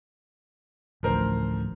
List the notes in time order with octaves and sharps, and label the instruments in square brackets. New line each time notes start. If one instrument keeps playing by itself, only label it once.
[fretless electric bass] A1 D2 [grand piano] F3 A#4 C5